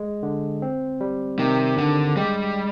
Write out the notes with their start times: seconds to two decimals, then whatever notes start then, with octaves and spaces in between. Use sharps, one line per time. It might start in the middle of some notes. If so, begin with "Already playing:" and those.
Already playing: G#3
0.23 D3
0.62 C4
1.01 G3
1.39 C3 D#3
1.78 G2 D3
2.16 G3 G#3